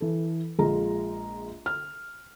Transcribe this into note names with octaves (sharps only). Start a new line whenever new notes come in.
E3 A4
A#1 G#3 F4 A#5
F6